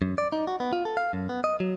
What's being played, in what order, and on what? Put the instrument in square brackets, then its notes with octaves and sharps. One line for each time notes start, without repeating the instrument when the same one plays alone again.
[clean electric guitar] F#2
D5
D#4
F#4
B3
F4
A4
F5
F#2
B3
D#5
F#3